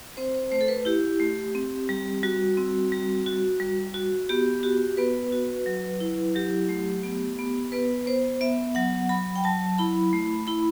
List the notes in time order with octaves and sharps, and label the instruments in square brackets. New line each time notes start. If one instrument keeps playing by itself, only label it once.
[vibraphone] C4 C5
C5
A3 C5
A4
B4
E4 G4
A3
C4
G3
G3 F#4
C4
G3
F#4
G3
F#4
B3 G4
F#4 G4
B3 B4
F#4
F#3
E4
F#3 G4
A3
B3
B3
B3 B4
B3 C5
B3 E5
F#3 F#5
F#3 B5
G5
F#3 A5
E4 B5
A3
E4 B5